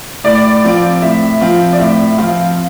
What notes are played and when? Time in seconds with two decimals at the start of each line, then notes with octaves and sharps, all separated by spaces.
0.24 A2 D5
0.64 F3 C4 F4
1.02 A2 E5
1.41 F3 C4 F4
1.73 D5
1.79 A2 E5
2.18 F3 C4 F4 F5